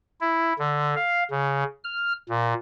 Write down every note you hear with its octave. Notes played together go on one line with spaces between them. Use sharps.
E4
D3
F5
C#3
F6
A#2